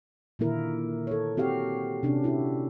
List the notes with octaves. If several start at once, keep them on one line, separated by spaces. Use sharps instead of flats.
A#2 D3 D#3 A#3 E4 A#4
A4 C#5
C4 F#4 G4 F5
C3 C#4 D4
E4 F#4